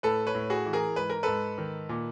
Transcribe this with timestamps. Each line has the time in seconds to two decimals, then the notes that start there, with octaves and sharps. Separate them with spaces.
0.03 A2 A4 B4
0.27 B4 C#5
0.35 A2
0.50 F#4 G#4
0.66 E3
0.73 G#4 A#4
0.96 G#2 B4
1.10 A#4
1.23 G#2 A4 B4
1.58 D#3
1.89 A#2